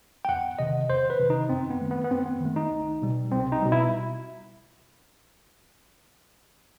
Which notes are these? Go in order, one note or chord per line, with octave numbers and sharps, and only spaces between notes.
G5
E2 F#5
C3 D#3 D#5
E2 C5
B4
C3 D#3
D#4
F#2 C4
B3
D#3 A3
B3
B3
F#2 C4
B3
D#3 A3
D#4
C2
B2 G3
C2 C4
D#4
B2 G3
E4